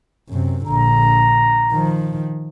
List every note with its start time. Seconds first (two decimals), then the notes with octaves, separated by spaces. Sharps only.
0.29 F#2 C3
0.66 A#1 D3 A#5
1.72 D#3 F3